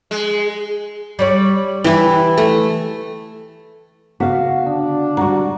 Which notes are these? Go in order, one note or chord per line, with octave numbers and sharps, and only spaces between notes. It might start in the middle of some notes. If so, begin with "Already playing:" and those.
G#3
G3 C#5 D5
E3 E4 G4
A3
C#3 B3 F#4 F5
D3 D4
G3 F#4 A#5 C#6